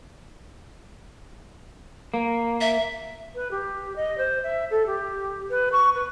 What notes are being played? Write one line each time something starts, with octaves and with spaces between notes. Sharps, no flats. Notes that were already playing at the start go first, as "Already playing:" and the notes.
A#3
E5
B4
G4
D#5
C5
E5
A4
G4
B4
C#6
B4